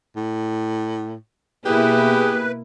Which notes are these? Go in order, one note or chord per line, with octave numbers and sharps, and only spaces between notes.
A2
B2 A#3 E4 G4 G#4 B4